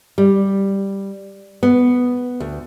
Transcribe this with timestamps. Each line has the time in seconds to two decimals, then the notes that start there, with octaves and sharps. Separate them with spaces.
0.18 G3
1.63 B3
2.40 D2